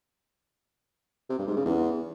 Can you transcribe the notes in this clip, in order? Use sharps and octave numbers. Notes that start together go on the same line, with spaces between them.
C3
G2
G#2
C#3
E2